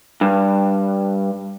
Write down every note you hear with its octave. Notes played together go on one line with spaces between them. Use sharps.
G2